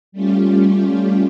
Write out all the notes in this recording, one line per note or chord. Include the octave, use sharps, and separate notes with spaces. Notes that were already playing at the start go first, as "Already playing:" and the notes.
G3 A3 C#4 F4 G4